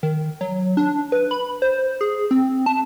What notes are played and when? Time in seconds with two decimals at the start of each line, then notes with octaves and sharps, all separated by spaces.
0.03 D#3
0.41 F#3
0.77 D4
1.12 B4
1.31 B5
1.62 C5
2.01 G#4
2.31 C4
2.66 A5